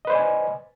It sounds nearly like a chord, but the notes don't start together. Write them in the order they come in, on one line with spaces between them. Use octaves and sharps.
D#5 B4 C5 D5 G#5